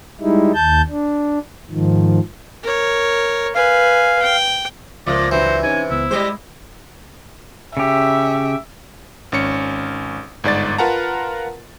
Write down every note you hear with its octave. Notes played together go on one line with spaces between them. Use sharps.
G3 G#3 D#4 E4
D#2 A5 G6
D4
G#2 D#3 F3
A#4 C#5
B4 F5 G#5
G5
C#2 A#2 F3 A#3 F4 D5 E5
G2 E3 F#3 C5
C3 C#4 D#4 G#5
C#2 B3 E4
G3 G#3 G4 C5 D#5
C#3 G4 E5
G#1 C#4 C#7
G1 G#2 D5 A6
F4 A#4 B4 F#5 A5 A#5